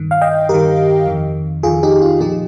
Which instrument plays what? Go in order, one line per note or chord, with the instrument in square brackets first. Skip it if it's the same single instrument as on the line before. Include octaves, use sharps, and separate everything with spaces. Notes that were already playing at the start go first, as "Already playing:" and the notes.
Already playing: [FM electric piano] G2 D#3
F5
D#5 G5
G2 D#3 G4 A#4
F2 D#3
F2 D#3 F4 G#4
D#4 G4
F4
A#2 F3 D#4 G4